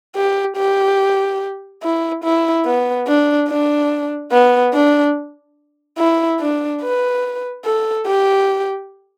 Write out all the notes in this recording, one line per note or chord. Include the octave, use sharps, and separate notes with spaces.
G4
G4
E4
E4
B3
D4
D4
B3
D4
E4
D4
B4
A4
G4